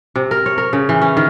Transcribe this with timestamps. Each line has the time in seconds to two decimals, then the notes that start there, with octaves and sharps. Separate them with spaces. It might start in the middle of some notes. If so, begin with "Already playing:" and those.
0.16 C3
0.31 A#4
0.46 C#5
0.58 A#4
0.73 C#3
0.89 E3
1.01 C#4
1.17 D#3